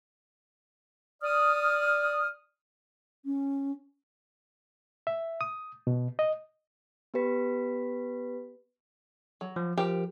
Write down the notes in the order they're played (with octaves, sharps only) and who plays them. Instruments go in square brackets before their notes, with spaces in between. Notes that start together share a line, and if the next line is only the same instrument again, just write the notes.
[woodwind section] D5 D#6 F6
[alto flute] C#4
[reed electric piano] E5
D#6
B2
D#5
[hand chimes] B3 G4 B4 B6
[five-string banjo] F#3
[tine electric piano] F3
[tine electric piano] F3 [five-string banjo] G4 A#4 G5